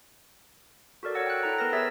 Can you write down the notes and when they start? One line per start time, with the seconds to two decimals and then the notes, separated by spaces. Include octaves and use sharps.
1.03 F#4 A4 A#4 D5
1.14 C#5 D5 F#5 E6 A#6
1.26 G5 F#6
1.43 E4 A4 G5 A#5
1.58 B3 A#4 B4 A#6
1.73 B3 G#4 C#5 E5 E6 A6